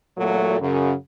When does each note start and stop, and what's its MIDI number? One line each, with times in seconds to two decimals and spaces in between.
0.18 0.60 40
0.18 0.60 46
0.18 0.60 54
0.18 0.60 57
0.18 0.60 66
0.18 0.60 69
0.60 0.93 42
0.60 0.93 49